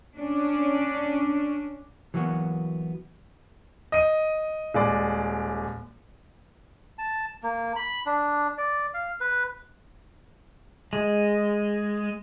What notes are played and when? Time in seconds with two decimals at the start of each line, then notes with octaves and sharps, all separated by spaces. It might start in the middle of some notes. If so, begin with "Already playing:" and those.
0.15 C#4 D4
2.14 E3 F#3 A#3 B3 F#4
3.92 D#5 D#7
4.74 D#1 G#3 D5
6.98 A5
7.43 A#3
7.76 B5
8.06 D4
8.58 D5
8.94 F5
9.20 B4
10.93 G#3